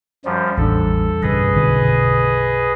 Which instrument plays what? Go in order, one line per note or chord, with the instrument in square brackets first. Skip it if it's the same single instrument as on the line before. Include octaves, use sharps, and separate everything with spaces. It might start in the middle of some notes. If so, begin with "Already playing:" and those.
[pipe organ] F#2 F3 G3
[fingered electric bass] A1 [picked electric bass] E2 G3 D4 [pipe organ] A4
[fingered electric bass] B1 G2 C#3 [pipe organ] G#4 B4 D#5
[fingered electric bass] B1 F#2 B2 [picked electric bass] D3